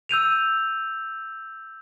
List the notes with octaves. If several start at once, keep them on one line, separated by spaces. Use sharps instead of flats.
E6 G6 D#7 F7